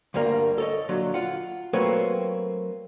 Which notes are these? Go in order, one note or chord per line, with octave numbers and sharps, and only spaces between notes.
D2 G2 G3 A#3 A#4
A4 C#5 D#5
A#2 D3 F#3
F4 F#5
F#3 A3 A#3 C4 B4 C#5